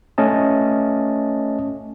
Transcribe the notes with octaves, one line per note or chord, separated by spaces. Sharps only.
A3 C#4 D#5 A5